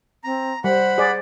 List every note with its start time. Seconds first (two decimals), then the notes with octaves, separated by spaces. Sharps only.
0.24 C4 A#5
0.64 G3 C5 F#5 B5
0.98 G#4 D5